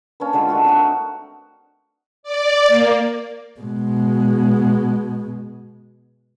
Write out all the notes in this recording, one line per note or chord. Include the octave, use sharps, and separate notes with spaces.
A#3 C#4 D4 B4
D3 D#3 G#3 F4
A3 F#4 A#4
C4 D4 D#4 F#4
A#4
D5
A#3
B2 G#3